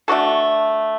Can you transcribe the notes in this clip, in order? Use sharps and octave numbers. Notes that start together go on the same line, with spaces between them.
A3 D4 F#4 A4